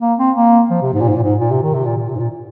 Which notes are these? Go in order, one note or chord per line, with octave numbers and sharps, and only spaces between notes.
A#3
C4
A#3
F3
C3
G#2
A#2
G#2
A#2
G#2
A#2
C3
D#3
C3
A#2
A#2
C3
G#2
A#2